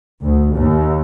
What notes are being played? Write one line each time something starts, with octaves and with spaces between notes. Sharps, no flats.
D2
D#2